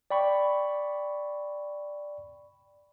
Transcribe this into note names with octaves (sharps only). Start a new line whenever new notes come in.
D5 G5 B5 C#6